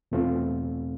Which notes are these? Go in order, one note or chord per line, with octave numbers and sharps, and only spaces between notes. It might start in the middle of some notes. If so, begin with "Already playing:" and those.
E2 B2 A3 C4 F4